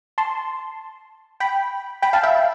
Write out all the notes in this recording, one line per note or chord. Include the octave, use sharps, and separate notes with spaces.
A5 C6
G5 B5
G5 B5
F5 A5
E5 G5